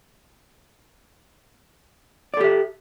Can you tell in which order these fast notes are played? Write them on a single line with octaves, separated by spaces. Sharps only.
D5 A4 G4 E5